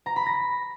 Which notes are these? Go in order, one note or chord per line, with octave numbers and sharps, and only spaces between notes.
A#5
B5
A#6